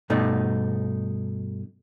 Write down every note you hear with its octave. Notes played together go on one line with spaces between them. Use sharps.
G2 B2 A3 D#4